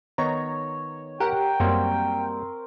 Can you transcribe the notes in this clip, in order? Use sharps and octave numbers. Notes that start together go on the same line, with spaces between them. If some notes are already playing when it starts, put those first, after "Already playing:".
D#3 B3 D#4 C#5 A#5
G4 A#4 F#5 G5
F#2 G3 A#3 C4 F#4